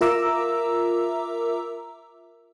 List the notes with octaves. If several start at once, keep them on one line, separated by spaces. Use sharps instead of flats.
F4 A#4 E5 A#5 D6 E6